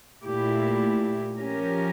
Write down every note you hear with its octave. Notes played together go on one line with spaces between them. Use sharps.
A#2 A3 E4 G4
F3 C#4 G4 A#4